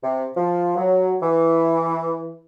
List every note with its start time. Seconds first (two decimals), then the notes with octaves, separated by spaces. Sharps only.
0.03 C3
0.37 F3
0.76 F#3
1.22 E3